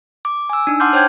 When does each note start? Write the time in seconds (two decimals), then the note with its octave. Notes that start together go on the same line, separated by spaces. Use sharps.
0.25 D6
0.49 G#5 E6
0.67 D4 D#4
0.80 F#5 A5 C6 D6 F6 G6
0.93 C5 C#5 G5 G6 G#6